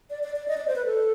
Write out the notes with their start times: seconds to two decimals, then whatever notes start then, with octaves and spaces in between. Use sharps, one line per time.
0.10 D5
0.23 D5
0.36 D5
0.48 D#5
0.57 D5
0.67 C5
0.76 B4
0.85 A4